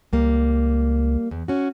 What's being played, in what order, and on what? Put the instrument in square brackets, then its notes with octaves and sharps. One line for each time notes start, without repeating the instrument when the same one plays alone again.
[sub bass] C#2 [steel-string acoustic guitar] G3 A#3
[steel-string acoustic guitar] E2
C#4 F#4